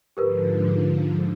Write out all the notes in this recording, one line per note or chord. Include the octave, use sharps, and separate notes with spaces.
G#2 D3 F3 G4 A#4 B4